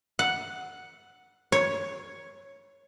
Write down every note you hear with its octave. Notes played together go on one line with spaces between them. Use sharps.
F#5
C#5